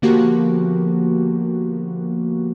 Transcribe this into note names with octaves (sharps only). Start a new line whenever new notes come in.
D3 F3 A#3 B3 F#4 G4